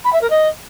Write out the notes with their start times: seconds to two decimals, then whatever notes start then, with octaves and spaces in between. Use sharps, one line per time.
0.04 B5
0.12 E5
0.21 A#4
0.30 D#5